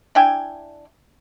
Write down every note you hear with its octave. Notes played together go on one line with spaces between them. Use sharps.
D4 E4 G5 G#5